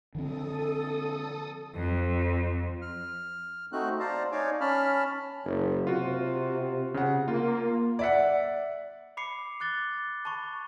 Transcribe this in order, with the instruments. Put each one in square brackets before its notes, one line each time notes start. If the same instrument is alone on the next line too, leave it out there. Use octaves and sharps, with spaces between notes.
[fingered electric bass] D3 F3 C4 [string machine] A4 D#6
[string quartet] F2
[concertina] F6
A3 C4 D#4 F#4 F#6
C5 D5 F5 A5 A#5
D#4 C#5 D5 F5 G#5 D6
C#4 A5 B5 F6
[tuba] F#1
[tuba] C3 [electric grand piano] F4 F#4
[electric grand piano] C#3 F#5
[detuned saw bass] A#3 [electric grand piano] F4
[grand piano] D5 E5 F#5
[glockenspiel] B5 D6 C7 C#7
D6 F#6 A6 G7
A5 B5 C#6